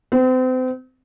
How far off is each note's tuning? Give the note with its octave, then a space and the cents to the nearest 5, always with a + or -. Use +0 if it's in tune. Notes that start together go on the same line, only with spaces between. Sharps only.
C4 -35